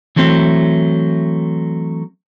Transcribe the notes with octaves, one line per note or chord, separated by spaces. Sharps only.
E3 F#3 A3 C4